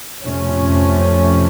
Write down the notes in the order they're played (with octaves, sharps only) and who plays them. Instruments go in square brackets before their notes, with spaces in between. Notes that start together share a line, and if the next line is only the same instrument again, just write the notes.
[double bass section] F2 C3 F3 A3 C#4